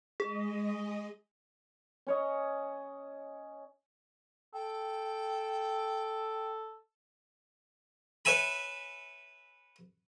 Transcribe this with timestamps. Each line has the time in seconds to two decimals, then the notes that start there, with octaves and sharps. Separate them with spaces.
0.20 G#3 G#4 D#5
2.07 C#4 C#5 D#5
4.54 A4 G5
8.25 B4 C#5 E5 G#5 B5